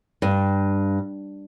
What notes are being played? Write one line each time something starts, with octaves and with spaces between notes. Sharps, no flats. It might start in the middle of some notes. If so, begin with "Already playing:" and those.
G2